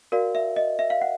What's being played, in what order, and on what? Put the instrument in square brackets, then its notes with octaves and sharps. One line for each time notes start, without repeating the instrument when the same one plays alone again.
[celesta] F#4 A#4 D5 F5
E5
D#5
E5
F5
F#5